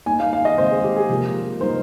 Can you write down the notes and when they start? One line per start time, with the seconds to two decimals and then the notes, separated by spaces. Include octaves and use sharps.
0.06 G3 A#3 D#4 G#5
0.20 F5
0.33 F5
0.45 D#5
0.58 C#3 G#3 C4 C5
0.71 G#4
0.84 G4
0.96 G#4
1.09 C3 F3 A#3 F4 A#4
1.60 G3 A#3 D#4 A#4 C5